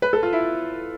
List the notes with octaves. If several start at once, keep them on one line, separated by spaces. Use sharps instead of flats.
B4
A4
F4
E4